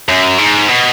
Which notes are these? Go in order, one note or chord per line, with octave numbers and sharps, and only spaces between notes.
F#2
G#2
B2